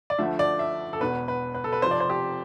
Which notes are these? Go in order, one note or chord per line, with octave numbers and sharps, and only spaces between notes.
D5
D2 D3 F3 A3 E5
D5
E5
A4
E1 E2 B2 B4
B4
B4
A4
B4
F1 F2 C3 F3 C5
D5
C5
G4